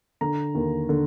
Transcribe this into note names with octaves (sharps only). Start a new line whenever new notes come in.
D3 A#5
D#2
D3